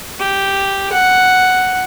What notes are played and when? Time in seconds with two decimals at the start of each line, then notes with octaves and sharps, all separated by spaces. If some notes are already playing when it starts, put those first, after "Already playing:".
0.20 G4
0.93 F#5